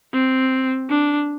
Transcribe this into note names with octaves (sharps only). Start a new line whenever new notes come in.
C4
D4